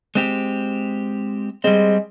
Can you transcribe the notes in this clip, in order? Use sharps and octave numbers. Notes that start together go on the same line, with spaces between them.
G#3 C4 G4
G3 G#3 C4